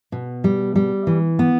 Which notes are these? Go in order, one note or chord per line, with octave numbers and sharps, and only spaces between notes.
B2
G3
G3
E3
B3